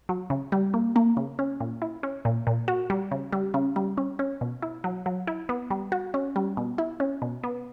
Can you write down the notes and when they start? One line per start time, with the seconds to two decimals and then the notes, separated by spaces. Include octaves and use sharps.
0.09 F#3
0.30 C#3
0.52 G3
0.74 A#3
0.96 A#3
1.17 C#3
1.39 C#4
1.60 A#2
1.82 E4
2.03 C#4
2.25 A#2
2.47 A#2
2.68 F#4
2.90 G3
3.11 C#3
3.33 G3
3.54 C#3
3.76 G3
3.97 C#4
4.19 C#4
4.41 B2
4.62 E4
4.84 F#3
5.06 F#3
5.27 E4
5.49 B3
5.71 G3
5.92 F#4
6.14 C#4
6.36 G3
6.57 B2
6.78 E4
7.00 C#4
7.22 B2
7.43 B3